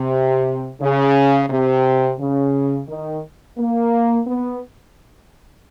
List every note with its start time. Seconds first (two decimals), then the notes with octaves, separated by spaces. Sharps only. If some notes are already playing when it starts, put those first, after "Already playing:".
Already playing: C3
0.81 C#3
1.50 C3
2.19 C#3
2.88 D#3
3.58 A#3
4.27 B3